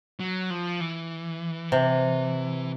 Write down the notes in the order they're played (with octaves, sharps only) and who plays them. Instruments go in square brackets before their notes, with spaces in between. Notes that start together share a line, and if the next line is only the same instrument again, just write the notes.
[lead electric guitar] F#3
F3
E3
[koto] C3